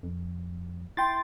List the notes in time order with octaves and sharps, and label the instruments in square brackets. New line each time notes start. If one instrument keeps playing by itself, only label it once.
[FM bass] F2
[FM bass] E4 [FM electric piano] G5 C6 A6